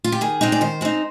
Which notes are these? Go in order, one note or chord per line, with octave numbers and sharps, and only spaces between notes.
F4
G4
D#3 G#4
G#3 C4 D#4
D5
D#3 C5
G#3 C4 D#4